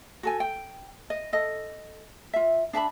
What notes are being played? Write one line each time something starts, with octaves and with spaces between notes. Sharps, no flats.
F#4 A4 G#5
G5
D#5
A4 D#5
F4 E5
D4 E5 A5 B5